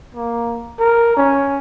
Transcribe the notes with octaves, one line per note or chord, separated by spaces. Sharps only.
A#3
A#4
C#4